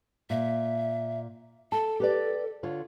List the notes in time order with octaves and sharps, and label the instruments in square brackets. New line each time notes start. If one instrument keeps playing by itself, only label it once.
[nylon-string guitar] A#2 [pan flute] E5
[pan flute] A4 [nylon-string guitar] A5
[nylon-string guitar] G4 B4 D5
D3 F4 C#5